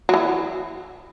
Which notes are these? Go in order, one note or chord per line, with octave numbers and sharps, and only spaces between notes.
F#3
E3